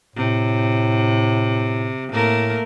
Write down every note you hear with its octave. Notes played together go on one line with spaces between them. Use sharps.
A2 C3
A2 A3 A#3 A#4